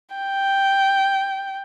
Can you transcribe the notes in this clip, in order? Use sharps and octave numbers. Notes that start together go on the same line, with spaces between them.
G5